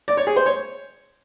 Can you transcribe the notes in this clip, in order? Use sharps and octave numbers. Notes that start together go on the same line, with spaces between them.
D5
C#5
G#4
C5
C#5